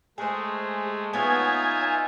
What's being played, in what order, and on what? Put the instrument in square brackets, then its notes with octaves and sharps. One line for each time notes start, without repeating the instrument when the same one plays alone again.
[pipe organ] G#3 A3 [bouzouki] G#4 C5
[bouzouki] B3 C#5 [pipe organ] D#4 F4 E5 [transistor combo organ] G#5